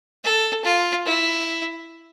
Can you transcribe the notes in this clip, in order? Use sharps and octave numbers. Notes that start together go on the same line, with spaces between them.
A4
F4
E4